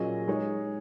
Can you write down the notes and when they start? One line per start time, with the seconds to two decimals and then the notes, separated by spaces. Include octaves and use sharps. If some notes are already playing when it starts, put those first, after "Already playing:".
Already playing: A#2 F#3 C#4 G#4 D#5
0.28 G#3 D#4 G#4 C#5